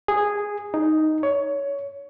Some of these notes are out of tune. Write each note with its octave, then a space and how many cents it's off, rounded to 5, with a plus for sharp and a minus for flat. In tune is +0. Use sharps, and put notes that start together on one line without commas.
G#4 -10
D#4 +0
C#5 +20